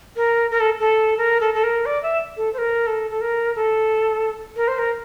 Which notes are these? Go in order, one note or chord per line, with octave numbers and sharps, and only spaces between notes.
A#4
A#4
A4
A4
A#4
A4
A4
A#4
D5
E5
A4
C5
A#4
A4
A4
A#4
A4
A#4
C5
A#4